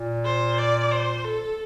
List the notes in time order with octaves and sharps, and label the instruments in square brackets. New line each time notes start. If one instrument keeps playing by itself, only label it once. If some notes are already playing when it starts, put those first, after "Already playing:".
Already playing: [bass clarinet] A#2
[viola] C5
D5
C5
A4